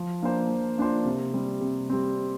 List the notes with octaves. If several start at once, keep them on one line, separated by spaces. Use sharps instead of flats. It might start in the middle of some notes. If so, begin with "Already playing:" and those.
Already playing: F3
A#3 D4 F4 C5
F3
A#3 D4 F4 C5
C3
G3 C4
C3
G3 C4